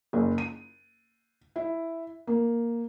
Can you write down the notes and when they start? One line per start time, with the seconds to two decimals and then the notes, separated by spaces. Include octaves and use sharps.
0.13 F#1
0.38 D#7
1.56 E4
2.27 A#3